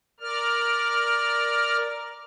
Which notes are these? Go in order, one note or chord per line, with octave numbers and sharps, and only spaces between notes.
A#4 D5 F6